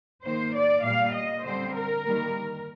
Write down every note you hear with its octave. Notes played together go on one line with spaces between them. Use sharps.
D#3 A#3 C5
D5
A#2 G3 A#3 F5
D#5
D3 G3 C4 C5
A#4
D#3 G3 A#3